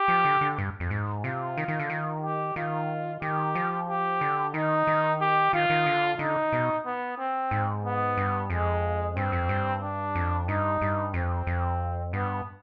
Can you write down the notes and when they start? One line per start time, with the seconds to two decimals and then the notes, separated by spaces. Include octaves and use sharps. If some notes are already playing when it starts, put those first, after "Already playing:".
Already playing: G4
0.08 F3
0.25 D3
0.41 D3
0.58 G2
0.80 F2
0.91 G#2
1.24 C3 F4
1.57 D#3
1.68 D#3
1.80 D3
1.90 D#3
2.22 G4
2.56 D#3 F4
3.22 D#3 G4
3.55 F3
3.88 G4
4.21 D3
4.54 D#3 D#4
4.87 D#3
5.21 G4
5.53 D#3 F4
5.70 D#3
5.86 D3
6.19 D3 D#4
6.53 B2
6.86 B3
7.18 C4
7.51 G#2
7.85 B3
8.17 G2
8.50 F2 G#3
9.16 G2 C4
9.32 F2
9.49 G2
9.82 D4
10.15 F2
10.48 G2 D#4
10.81 G2
11.14 F2 C4
11.47 F2
12.13 G2 B3